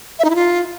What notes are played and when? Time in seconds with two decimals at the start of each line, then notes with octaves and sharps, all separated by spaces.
0.19 E5
0.24 D#4
0.30 E4
0.35 F4